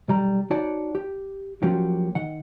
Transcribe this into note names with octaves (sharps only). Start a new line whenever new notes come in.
B1 G3 A#5
D#4 F#4 C#5 D5 F#5 A5
G4
F3 F#3 A#3 C#4 F#4 G4
D#3 F#5